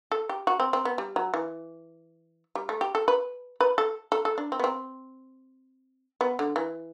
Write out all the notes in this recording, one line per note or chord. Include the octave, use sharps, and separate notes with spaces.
A4
G4
F#4
C4
C4
B3
G3
F#3
E3
G3
A3
G4
A4
B4
B4
A4
A4
A4
D4
C4
B3
C4
B3
D3
E3